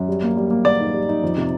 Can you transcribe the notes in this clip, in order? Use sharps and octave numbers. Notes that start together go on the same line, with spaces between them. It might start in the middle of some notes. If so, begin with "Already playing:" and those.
Already playing: F#2
G3
A#3
G3
A#3
A#3 D5
D#4
G3
D#4
F2
C3